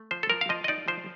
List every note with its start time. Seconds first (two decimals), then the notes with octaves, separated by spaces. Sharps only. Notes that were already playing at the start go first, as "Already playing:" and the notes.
Already playing: A3
0.11 F3 C5
0.23 A4
0.30 F3 A#4
0.41 F5
0.49 F3 D#5
0.64 D#5
0.68 D#4 D5
0.88 F3 C5